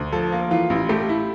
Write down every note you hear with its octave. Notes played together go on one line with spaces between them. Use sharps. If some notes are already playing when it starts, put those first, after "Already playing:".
Already playing: D2
F3 A4
A#3
E3 F4
A1
A3 G4
E4